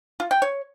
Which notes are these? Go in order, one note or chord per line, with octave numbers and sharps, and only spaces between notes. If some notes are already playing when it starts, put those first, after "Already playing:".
F4
G5
C#5